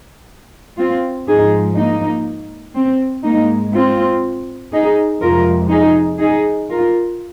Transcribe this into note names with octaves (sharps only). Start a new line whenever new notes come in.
C4 F4
G#2 F3 G#3 D#4 G#4
A#3 D#4
C4
G#2 G#3 A#3 D#4
C4 F4
D#4 G#4
F2 C3 G#3 F4 A#4
D#4 G#4
D#4 G#4
F4 A#4